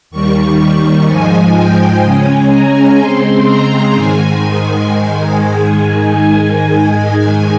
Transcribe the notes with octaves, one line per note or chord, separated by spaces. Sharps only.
D#2 D#3 G3 C#6
G#2 F3 G#3 G#5
G5
C#3 G#3 C#4 G#5
A#5
C#3 G#3 C4 C6
A#5
G#2 D#3 G#3 G#5